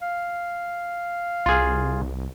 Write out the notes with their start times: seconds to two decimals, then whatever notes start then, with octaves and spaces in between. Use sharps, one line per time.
0.02 F5
1.46 C2 F4 G#4